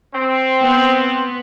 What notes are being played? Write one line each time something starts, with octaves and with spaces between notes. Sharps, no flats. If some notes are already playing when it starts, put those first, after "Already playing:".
C4
B3